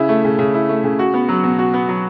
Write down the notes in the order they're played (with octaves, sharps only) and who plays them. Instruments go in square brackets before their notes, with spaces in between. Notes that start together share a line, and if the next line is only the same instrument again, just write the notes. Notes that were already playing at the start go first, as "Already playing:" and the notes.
Already playing: [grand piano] C#3 E4
A3
C#3
C#3
E4
A3
C#3
F#4
B3
F#3
B2
F#4
B3
F#3